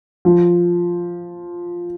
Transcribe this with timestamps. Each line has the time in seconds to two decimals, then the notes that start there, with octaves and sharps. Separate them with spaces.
0.25 F3